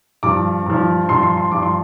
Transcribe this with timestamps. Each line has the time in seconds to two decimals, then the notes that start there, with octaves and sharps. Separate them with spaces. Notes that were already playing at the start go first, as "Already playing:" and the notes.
0.23 G2 F3 D6
0.66 G2 F3
1.09 G2 F3 C6
1.23 C6
1.37 C6
1.52 G2 F3 D6
1.63 C6